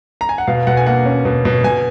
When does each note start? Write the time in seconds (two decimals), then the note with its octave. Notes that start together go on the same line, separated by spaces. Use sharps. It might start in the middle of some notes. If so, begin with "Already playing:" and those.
0.21 A#5
0.29 G#5
0.38 F#5
0.47 B2 F5
0.67 B2 F#5
0.77 G#5
0.86 A#3 F#5
1.06 C#4
1.25 B2
1.45 B2
1.64 B2 G#5